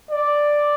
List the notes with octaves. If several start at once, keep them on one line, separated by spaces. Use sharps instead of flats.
D5